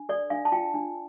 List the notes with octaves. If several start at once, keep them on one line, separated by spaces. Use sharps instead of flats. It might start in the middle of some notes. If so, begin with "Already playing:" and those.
Already playing: D4
A4 D5
D4 F5
A5
F4 G5
D4